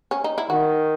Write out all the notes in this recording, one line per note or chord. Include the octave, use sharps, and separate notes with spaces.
C#4
D#4
E4
D#3 F#4